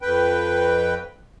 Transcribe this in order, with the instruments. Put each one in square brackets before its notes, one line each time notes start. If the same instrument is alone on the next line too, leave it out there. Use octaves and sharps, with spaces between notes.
[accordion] F2 B4 G5